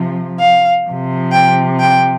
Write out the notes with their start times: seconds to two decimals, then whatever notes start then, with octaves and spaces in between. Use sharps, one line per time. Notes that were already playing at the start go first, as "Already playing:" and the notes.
Already playing: C3 F3
0.39 F5
0.86 C3 F3
1.33 G5
1.80 G5